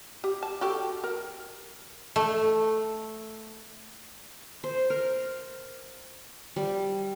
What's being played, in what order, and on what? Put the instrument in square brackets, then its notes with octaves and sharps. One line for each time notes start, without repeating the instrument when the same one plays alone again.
[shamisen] G4
A5
F#4 G4 A4
A#4
[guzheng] A3
[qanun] C5
A#4
G3